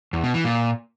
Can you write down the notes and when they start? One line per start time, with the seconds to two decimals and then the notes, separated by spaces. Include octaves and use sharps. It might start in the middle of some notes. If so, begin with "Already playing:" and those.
0.13 E2
0.24 B2
0.34 E3
0.45 A#2